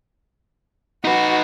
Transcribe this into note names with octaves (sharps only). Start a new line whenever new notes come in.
D#4 F#4 B4